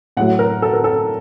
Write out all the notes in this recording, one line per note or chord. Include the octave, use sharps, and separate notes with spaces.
A2 F#3 A3 F#5
A#4
A4
A#4
A4